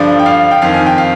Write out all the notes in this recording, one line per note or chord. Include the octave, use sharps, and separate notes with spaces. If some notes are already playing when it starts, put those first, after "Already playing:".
Already playing: G2 D3 F3 D5
G5
F5
G5
F2 D#3 F5
G#5
G5
F5